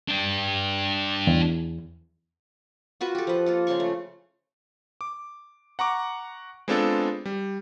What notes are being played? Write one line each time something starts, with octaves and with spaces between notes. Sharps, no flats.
D4 G5
E2
F4 F#4 B4 C#6
G4 A4
F3 B4
A#3 F4 A4
C#3 C5 C6 C#6
A3
D6
F#5 A#5 C#6 D6
G#3 B3 C4 D4 F4 A4
G3